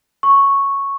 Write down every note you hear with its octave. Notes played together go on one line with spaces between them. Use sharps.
C#6